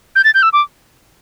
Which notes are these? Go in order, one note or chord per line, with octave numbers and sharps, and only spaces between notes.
G6
A6
G6
E6
D6